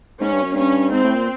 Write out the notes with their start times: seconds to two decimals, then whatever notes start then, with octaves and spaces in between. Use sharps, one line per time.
0.20 G#2 C#4
0.32 G2
0.43 F#2
0.55 G2 C#4
0.92 G#2 C4
1.04 A2
1.15 A#2